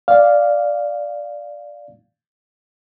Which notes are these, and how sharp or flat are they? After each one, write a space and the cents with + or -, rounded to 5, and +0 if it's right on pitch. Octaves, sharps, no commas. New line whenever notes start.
D5 +0 F5 +0